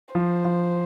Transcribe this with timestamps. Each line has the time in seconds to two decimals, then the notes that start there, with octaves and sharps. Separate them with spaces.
0.15 F3 C5
0.45 F3